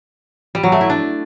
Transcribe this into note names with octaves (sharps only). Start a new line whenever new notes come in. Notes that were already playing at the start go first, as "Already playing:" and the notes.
G3
F#3
A3
E4
D4